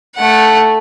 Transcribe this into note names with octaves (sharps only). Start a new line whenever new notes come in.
A3 F#5